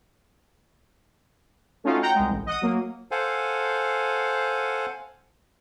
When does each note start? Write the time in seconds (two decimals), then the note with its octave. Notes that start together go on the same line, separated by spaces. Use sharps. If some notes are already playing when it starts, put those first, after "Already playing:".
1.84 A3 C#4 D#4 F4 F#4 F5
2.01 F#5 G5 A#5 G6
2.15 C2 G#3
2.31 A1
2.46 D#5 F#5 D#6
2.61 F#3 A#3
3.11 A4 C5 F5 F#5 G#5